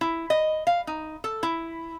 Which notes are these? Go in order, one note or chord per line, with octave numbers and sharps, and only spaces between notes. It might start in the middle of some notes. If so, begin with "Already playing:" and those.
E4
D#5
F5
D#4
A4
E4